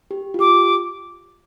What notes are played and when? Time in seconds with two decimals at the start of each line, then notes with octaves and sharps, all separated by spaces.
0.11 G4
0.34 F4
0.39 G4 D6